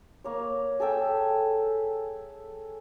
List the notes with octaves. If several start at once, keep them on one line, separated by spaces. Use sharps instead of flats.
A#3 C#5
G#4 A4 E5 G5